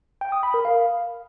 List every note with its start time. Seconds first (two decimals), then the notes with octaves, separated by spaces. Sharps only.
0.21 G5
0.32 D#6
0.43 B5
0.54 A#4
0.65 F5